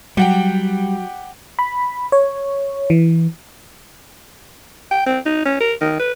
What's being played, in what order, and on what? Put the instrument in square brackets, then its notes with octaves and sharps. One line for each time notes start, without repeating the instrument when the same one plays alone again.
[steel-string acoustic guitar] F#3 [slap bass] G3 [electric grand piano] G4 F#5 G5
[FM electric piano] B5
C#5
E3
[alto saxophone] G5
C4
D#4
C#4
A#4
D#3
B4